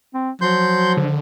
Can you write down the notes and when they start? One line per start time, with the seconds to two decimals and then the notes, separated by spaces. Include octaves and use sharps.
0.14 C4
0.41 F3 F#3 C6 G6
0.97 D3